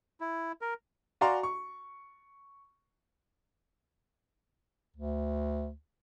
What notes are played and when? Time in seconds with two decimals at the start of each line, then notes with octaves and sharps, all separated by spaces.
0.21 E4
0.61 A#4
1.21 F#4 D5 F5 G#5 A#5 C6
1.43 C#6
4.97 D2